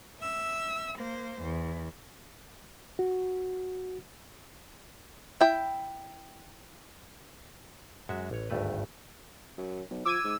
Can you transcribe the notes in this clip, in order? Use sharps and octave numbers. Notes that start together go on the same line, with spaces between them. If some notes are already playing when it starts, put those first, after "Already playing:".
E5 E6
A#3 C5
E2
F#4
E4 G5
F#2 G#3 F#4 E5
A1 C#5
G#1 D2 G2 A3 B4
F#2
B1
F3 D6 E6 G#6 D#7
G#2